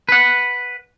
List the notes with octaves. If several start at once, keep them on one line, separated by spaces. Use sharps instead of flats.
B4 F#5